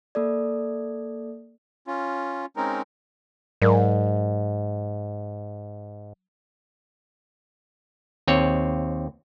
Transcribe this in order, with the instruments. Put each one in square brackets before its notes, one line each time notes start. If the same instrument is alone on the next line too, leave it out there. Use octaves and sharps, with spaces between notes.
[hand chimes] A#3 A4 D5
[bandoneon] C#4 F4
G#3 C4 C#4 D#4 A#4
[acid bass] G#2 [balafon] F#3 A#4 D5
[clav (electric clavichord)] D#2 C4 C#5